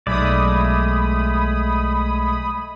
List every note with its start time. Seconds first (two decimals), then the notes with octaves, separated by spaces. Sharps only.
0.07 B1 G#3 A3 D5 B5 D#6